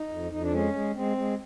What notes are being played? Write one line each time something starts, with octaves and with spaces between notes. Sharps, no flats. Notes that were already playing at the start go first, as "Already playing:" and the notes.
Already playing: D#4
F2
F2 D#4
D4
G#3 C#4
G#3
G#3 C4
G#3